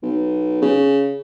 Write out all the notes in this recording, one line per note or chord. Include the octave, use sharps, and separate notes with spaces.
B1
C#3